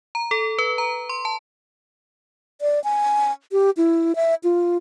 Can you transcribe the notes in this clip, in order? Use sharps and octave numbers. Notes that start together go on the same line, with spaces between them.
A#5
A4
B4
A#5
C6
A5
D5
G#5
G4
E4
E5
F4